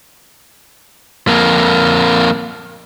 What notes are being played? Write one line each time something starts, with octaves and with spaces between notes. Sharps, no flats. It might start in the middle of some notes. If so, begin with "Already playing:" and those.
F2 A#3